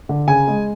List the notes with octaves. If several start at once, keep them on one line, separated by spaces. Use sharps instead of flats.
D3
C#3 G#5
G#3